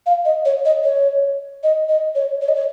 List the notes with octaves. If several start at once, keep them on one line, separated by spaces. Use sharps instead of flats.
F5
D#5
C#5
D#5
C#5
D#5
D#5
C#5
C#5
D#5
C#5